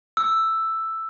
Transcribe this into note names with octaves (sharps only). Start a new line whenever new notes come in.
E6